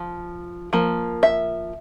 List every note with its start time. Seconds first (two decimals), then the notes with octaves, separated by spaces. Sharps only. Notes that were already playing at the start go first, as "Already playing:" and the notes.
Already playing: F3
0.73 F3 A#3
1.23 E5